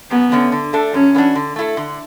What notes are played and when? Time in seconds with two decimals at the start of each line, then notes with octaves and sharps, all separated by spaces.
0.11 F#2 B3
0.32 D3 A3 C#4
0.52 D3
0.73 A3 D4 A4
0.94 F#2 C#4
1.15 E3 B3 D4 F#4
1.35 D3
1.56 A3 E4 A4
1.77 D3